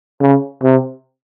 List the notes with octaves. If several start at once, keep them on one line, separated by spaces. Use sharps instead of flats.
C#3
C3